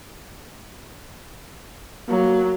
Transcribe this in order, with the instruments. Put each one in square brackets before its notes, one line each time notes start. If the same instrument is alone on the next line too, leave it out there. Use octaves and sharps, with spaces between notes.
[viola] F#3 [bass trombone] A#3